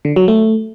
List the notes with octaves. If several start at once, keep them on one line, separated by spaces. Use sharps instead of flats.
D3
F#3
A3